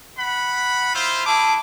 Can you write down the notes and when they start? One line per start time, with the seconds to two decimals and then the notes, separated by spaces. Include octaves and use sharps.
0.18 F#5 B5
0.93 E4 F4 C5
1.27 E4 G#4 A5 D6